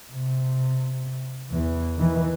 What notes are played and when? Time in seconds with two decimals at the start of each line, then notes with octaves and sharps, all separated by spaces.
0.12 C3
1.50 E2 E3
1.97 D#3 E3